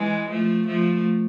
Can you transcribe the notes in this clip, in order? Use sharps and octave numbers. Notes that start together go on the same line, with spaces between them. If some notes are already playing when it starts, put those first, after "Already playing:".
Already playing: E3 G#3
F3 A3
F3 A3